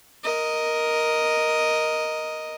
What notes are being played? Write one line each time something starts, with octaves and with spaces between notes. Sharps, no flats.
A#4 D#5